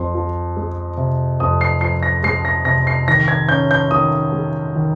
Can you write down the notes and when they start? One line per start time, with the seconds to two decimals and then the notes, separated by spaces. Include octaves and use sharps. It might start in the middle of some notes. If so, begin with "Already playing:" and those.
Already playing: F2 C6
0.14 F3
0.57 G#3
0.97 C3
1.40 F2 D#6
1.61 C7
1.81 F3 C7
2.03 A#6
2.23 G#3 C7
2.45 A#6
2.65 C3 A#6
2.87 C7
3.08 D#3 A#6
3.28 G#6
3.49 C#4 G6
3.71 G6
3.91 D#3 D#6
4.32 G#3
4.75 D#3